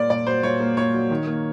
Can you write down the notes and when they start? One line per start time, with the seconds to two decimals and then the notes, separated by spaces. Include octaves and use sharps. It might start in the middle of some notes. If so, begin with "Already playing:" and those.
Already playing: A#2 A#3 D5
0.10 A#2 D5
0.27 F#3 C5
0.43 A#2 C#5
0.60 A#3
0.77 A#2 C#5
0.94 F#3
1.10 D#3
1.27 A#3